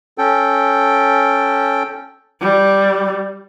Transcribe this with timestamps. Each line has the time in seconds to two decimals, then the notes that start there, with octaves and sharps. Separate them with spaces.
0.18 C#4 A4 G5
2.41 G3